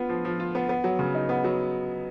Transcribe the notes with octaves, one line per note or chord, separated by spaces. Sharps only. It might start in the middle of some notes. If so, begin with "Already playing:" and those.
Already playing: B3 F4
F3
F3
F4
B3
B3
F#3
C#3
D#4
B3
F#3